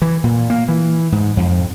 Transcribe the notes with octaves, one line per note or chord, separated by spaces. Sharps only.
E3
A#2
A#3
E3
G#2
F2